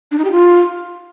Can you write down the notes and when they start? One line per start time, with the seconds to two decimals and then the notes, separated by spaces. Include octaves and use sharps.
0.11 D4
0.18 D#4
0.25 G4
0.31 F4